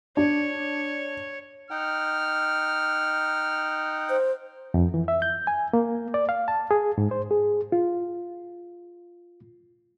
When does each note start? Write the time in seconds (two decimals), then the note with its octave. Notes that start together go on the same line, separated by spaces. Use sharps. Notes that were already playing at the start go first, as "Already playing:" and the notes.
0.17 D4 C#5
1.71 D#4 F#5 G5 F6
4.10 C5
4.74 F2
4.94 E3
5.08 E5
5.22 G6
5.47 G#5
5.73 A#3
6.14 D5
6.29 F5
6.48 A5
6.71 G#4
6.98 G#2
7.11 C5
7.31 G#4
7.72 F4